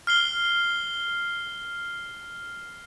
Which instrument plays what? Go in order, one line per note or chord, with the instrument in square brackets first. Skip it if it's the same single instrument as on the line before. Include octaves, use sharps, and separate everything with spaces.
[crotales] F6 C7 G7